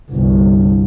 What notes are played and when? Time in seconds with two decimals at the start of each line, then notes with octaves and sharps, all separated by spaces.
0.11 G1 C2